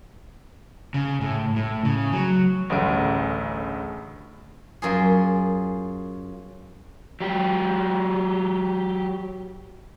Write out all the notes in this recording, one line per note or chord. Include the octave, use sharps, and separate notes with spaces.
C#3
A2
A2
C#3
F#3
A1 D2 G2 C#3 D7
F#2 F4 G#4
F#3 G4